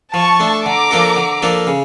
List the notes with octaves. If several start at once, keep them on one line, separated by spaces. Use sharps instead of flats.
F3 A5 C#6
A3 D4
D3 A#5 D6
F3 A#3 D4 A4
D3
F3 A#3 D4 A4
C#3